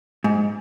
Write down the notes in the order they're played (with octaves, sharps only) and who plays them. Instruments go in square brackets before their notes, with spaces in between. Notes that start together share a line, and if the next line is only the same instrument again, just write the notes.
[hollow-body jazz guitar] G#2